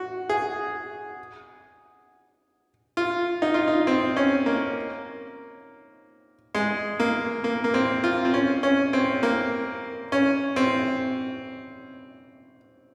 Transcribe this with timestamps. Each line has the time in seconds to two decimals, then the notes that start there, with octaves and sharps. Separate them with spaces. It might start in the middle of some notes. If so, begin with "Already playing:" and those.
Already playing: F#4
0.29 G#4
2.97 F4
3.42 D#4
3.54 F4
3.68 D#4
3.87 C4
4.17 C#4
4.46 A#3
6.55 G#3
7.00 A#3
7.44 A#3
7.64 A#3
7.74 C4
8.04 F4
8.25 C4
8.34 C#4
8.63 C#4
8.93 C4
9.23 A#3
10.12 C#4
10.56 C4